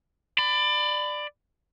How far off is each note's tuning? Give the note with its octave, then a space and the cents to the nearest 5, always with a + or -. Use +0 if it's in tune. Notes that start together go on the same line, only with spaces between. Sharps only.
D5 +15 B5 +25